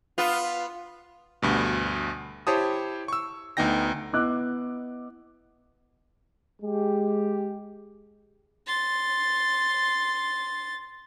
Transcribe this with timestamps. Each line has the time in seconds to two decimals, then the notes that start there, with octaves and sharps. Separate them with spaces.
0.18 B3 F4
1.42 D2 G2 B2
2.47 E4 G4 C5 C#5 A5 D#6
3.08 C#6 E6
3.57 D2 B3 D#4 G5 A#6
4.13 B3 E4 D#5 D6 E6 F#6
6.62 G#3 G4
8.66 C6 A6